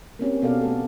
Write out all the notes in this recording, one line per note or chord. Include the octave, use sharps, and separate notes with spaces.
A#3 C4 C#4 G4
B2 B3 C#4 A4 D5 F5
A3 A4